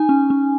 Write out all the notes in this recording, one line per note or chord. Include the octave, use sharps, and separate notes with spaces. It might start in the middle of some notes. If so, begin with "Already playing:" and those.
Already playing: D#4 G#5
C#4
C#4